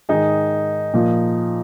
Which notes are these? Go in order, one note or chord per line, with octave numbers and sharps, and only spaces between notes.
G#2 D#3 D#4 G#4
A#2 F3